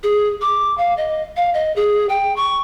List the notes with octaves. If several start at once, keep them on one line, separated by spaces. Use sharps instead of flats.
G#4
D6
F5
D#5
F5
D#5
G#4
G5
C#6